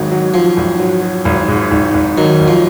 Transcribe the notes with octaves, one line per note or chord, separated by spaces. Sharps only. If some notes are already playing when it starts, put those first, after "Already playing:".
Already playing: G#1 G#2 D#3 F#3
F#3
F3 F#3
G#1
F#3
F#3
G#1
G#2
G#1
G#1
D#3 F#3
G#1
F3